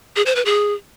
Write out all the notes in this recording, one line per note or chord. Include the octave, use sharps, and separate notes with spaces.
G#4
C5
B4
G#4